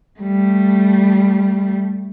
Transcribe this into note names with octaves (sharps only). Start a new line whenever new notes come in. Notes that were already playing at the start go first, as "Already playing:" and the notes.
G3 A3